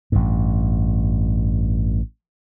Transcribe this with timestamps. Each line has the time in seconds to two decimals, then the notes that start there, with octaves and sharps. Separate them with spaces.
0.12 A1 G2